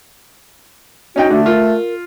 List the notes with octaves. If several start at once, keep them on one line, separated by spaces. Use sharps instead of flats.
C#4 D#4 F#4 G5
D3 A3
F4 A#4